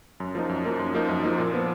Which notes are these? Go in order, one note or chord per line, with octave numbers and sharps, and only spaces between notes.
F#2
F3 A#3 D#4
F#2
F3 A#3 D#4
F#2
F3 A#3 D#4
F#2
F3 A#3 D#4
A#2
F3 B3